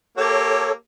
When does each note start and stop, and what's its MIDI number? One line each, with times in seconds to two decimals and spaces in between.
0.17 0.73 58
0.17 0.73 67
0.17 0.72 69
0.17 0.72 73